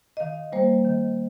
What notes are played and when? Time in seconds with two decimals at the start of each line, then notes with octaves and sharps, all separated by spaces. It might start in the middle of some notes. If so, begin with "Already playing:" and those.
0.17 D#5
0.20 D#3 F5
0.52 G3 A#3 C5
0.85 D#3